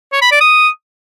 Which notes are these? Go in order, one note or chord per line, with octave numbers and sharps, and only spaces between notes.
C#5
B5
D5
D#6